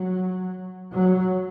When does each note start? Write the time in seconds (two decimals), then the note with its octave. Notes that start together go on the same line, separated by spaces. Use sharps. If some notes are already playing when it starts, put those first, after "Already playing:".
Already playing: F#3
0.93 F#3